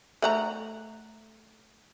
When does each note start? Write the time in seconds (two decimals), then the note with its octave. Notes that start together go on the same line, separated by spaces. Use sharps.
0.22 A3 F#5 A#5